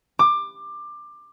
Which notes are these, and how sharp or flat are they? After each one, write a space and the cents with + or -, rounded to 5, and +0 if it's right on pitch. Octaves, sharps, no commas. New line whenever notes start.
D6 +20